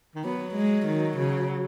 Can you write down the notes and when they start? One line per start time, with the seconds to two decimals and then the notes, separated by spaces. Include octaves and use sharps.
0.15 D#3
0.24 F#3 B3
0.55 G#3
0.87 D#3
1.18 C#3